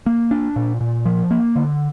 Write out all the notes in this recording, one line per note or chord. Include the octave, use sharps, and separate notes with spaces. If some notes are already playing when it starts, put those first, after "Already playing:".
A#3
D4
A#2
A#2
F3
A#3
D3